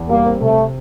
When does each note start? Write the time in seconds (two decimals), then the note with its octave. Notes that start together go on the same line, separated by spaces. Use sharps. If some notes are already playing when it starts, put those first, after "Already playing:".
Already playing: E2
0.09 G3 A#3
0.26 C4
0.41 C3 A3
0.58 C4